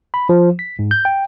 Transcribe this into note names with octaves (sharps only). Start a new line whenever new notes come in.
B5
F3
B6
G#2
G6
G5